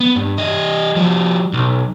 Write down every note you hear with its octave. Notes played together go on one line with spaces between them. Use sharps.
B3
G2
G3 D#5
F3 G3
B1